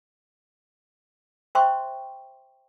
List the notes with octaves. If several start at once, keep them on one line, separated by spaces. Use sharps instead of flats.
C5 E5 G5 C6 C#6